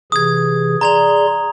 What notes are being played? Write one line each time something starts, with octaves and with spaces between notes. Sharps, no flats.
C3 E3 G#4 D#6 G#6
G#4 D5 A#5 C6 G#6 F7